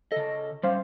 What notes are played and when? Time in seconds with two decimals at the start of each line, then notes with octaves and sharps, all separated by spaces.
0.12 C#3 A4 D#5
0.63 G3 C#4 C5 F5